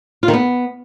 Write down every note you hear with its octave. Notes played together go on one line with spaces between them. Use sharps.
F4
D#3
B3